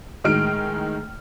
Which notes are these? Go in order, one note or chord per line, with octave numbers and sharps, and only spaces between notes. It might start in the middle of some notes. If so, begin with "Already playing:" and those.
A2 D#3 G#3 D#4 F6 D7